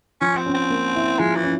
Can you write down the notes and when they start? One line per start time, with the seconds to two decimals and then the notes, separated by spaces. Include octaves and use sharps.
0.21 F3 C#4
0.37 C4
0.46 C#4
0.54 C4
0.70 A#3
0.95 E4
1.19 F3 G#3
1.36 E3
1.44 C#4